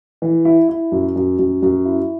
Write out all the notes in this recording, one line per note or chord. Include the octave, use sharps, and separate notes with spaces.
E3
E4
E4
F#2
F#2
F#2
F#2
E4